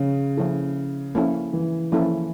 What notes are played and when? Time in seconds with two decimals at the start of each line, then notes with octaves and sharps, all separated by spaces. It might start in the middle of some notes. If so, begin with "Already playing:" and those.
Already playing: C#3 F3
0.37 F3 A#3 C#4 E4 A4
1.15 F3 A#3 C#4 E4 A4
1.53 E3
1.92 F3 A#3 C#4 E4 A4